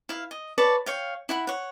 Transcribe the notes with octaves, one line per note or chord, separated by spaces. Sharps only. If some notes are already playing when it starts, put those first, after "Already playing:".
E4 F5
D#5
B4 C#5 D5 A5
C#5 F5 G5
E4 F#5 B5
C#5 F#5